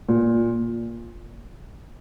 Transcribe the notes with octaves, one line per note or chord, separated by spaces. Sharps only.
A#2